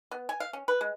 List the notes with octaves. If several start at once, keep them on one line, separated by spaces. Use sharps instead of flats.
B3
G#5
F5
C#4
B4
G#3